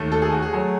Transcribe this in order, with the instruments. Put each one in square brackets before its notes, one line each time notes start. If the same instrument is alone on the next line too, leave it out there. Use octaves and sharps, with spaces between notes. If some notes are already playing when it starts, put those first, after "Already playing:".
Already playing: [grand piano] D#2 D#3 A3
A4
G#4
F#4
G#4
F#3 A3